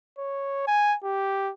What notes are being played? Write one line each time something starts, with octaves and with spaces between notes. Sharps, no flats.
C#5
G#5
G4